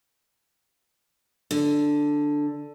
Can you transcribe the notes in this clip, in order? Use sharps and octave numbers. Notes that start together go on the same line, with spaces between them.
D3